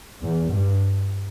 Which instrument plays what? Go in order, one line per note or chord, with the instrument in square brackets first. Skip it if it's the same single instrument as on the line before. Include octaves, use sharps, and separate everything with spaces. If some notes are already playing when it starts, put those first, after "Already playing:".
[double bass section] E2
G2